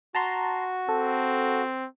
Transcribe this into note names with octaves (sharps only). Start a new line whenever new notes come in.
F#4 A5 A#5 C6
C4 A4